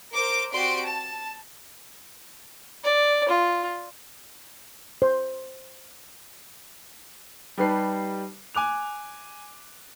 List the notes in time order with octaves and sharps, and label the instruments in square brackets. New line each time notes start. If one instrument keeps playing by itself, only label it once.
[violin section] A#4 C5 D6
C4 F#4 G4 D5 C6 D7
A5
[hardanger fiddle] D5
F4
[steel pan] C5
[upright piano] G3 D#4 G4 B4 A5 C7
G#5 D6 F#6 F7